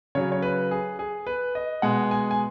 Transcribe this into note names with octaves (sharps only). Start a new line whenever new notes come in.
C#3 F#3 C#5
C#5
B4
G#4
G#4
B4
D#5
B2 G#3 F#5
G#5
G#5